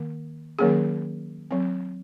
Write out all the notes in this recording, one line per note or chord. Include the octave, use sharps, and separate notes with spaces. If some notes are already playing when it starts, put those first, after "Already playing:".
Already playing: D#3 A#3
D#3 F#3 A#3 C#4 G#4
F#3 C4